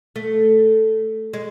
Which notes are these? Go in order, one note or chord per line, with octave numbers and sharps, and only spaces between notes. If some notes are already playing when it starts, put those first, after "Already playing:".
A3
G#3